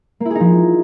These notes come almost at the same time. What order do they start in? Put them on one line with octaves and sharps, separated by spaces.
A#3 E4 G#4 D#4 F3